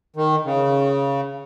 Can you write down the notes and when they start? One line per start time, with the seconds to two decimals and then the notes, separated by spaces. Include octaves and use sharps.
0.16 D#3
0.45 C#3